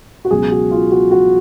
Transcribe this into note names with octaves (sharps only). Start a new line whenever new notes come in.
F#4
C#2 B2 F#3 G#4
F#4
F4
F#4
F#4